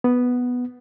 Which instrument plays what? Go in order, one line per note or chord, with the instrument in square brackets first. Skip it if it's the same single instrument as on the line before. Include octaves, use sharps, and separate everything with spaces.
[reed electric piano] B3